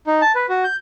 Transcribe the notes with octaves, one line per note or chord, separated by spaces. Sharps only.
D#4
A5
B4
F#4
G6